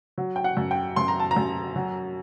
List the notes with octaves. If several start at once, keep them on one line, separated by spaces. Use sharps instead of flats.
F#3
G5
F#5
F#2
G5
F#2 C6
A#5
A5
A#5
F#2
F#3